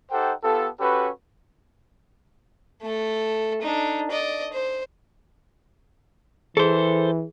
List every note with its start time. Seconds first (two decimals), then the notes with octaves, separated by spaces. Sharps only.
0.11 D#4 G4 A4 C5 F#5 G5
0.43 B3 F4 G4 A4
0.79 C#4 F#4 G4 A4 B4
2.82 A3 A4
3.62 D4 D#4
4.11 D5 D#5
4.53 C5
6.57 E3 G#4 A4 C5